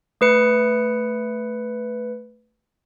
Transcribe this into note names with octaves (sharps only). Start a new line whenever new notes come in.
A3 B4 C#7